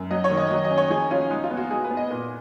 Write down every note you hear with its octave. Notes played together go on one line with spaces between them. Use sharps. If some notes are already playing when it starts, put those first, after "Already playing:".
Already playing: F#2
F#3 D#5
C#5
D#3
D#5
F#3 D#5
D#5
C#4
C#5
F3 G#4
C#4 F4
G#3 D#4
F4
B3
F#4
G#3 G#4
B4
B3
D#5
A#2